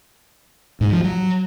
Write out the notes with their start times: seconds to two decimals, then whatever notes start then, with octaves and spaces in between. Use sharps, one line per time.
0.81 G#2
0.92 F3
1.04 F#3